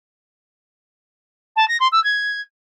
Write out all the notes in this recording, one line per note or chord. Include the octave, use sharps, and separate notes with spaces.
A5
A#6
C6
E6
G#6